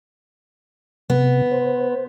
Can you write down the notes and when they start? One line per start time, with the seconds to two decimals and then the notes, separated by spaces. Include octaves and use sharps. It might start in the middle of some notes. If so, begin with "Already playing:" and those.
1.10 C3 B3
1.52 C5